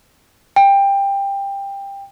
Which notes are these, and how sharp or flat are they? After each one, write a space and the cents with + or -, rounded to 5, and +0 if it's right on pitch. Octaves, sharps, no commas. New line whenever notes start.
G5 +20